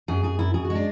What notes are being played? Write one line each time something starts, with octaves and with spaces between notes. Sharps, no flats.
F#2 G#4
F#2 G#4
F#2 E4
F#2 G#4
F#4
G#3
D4